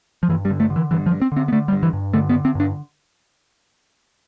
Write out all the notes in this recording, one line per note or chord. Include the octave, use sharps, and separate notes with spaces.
F3
G2 E3
G3
D3
A3
D3
E3
G2 E3
F3
G2
C4
D3 C4
B3
D3 A3
G3
G2
E3
G2
D3 A3
B3
D3
C4
G2 D4